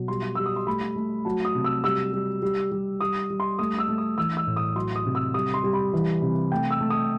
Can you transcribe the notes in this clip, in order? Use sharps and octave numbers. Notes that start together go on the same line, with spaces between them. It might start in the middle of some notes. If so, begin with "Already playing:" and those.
Already playing: B2 F#3
G3 C6
G3 E6
D#6
C6
A3 B5
A3
F#3 A5
D#6
C3
E6
G3 E6
G3
G3
G3
G3 D#6
G3
C6
A3 D#6
E6
A3
D#6
E3 E6
E6
A2
D#6
F#3 C6
D#6
C3
E6
G3 D#6
C6
G3
B5
E3
C3
A3 G5
E6
A3
D#6